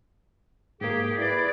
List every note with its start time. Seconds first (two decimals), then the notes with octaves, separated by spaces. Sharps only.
0.81 G#2 A#3 G4 G#4
1.18 E4 B4 D5